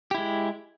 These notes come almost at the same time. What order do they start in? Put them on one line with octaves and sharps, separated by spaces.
G4 E4 G#3